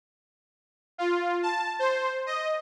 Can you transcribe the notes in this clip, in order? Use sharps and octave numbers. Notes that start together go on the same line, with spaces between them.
F4
A5
C5
D#5